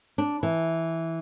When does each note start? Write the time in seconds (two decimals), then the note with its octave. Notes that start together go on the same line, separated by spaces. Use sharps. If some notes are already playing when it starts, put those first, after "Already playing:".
0.18 D4
0.43 E3